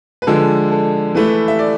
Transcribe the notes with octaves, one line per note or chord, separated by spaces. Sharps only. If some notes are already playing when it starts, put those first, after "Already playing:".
B4
D3 F3 G#3 A4
A4
E3 A3 E4 B4
E5
D5